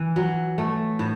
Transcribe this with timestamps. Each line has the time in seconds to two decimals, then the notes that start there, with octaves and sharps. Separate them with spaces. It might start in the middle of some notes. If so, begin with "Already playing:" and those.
Already playing: E3
0.16 F#3
0.58 A3
0.99 A2